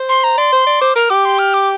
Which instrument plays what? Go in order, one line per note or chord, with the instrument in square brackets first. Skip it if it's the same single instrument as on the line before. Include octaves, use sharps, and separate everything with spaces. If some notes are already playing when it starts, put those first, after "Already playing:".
Already playing: [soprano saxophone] C5
[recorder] C6
A#5
[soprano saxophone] D5 [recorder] C6
[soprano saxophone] C5
D5
[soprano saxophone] C5 [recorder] D6
[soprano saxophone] A#4 [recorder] F6
[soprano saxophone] G4 [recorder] D6
[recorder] C6
F6
D6